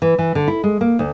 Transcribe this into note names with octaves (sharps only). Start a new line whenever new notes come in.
E3
E3
D3
E4
G#3
A#3
D2